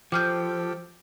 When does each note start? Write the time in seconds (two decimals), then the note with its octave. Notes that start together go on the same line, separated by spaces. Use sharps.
0.12 F3 G4 A4 G5 D6 F6 G6